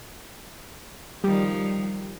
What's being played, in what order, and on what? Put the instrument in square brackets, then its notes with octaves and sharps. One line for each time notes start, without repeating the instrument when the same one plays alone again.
[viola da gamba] D#3 F3 [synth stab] G3